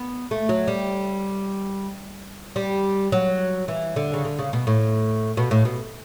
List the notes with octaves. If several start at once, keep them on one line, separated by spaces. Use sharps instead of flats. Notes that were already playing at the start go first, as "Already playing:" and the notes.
Already playing: B3
A3
F#3
G3
G3
F#3
E3
D3
C#3
D3
C#3
B2
A2
B2
A2
B2